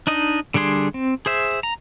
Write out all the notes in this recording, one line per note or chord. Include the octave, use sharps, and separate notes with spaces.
D4 D#4 D#5
D3 G3 D4 G#4 C6
C4
G#4 C5 E5
A#5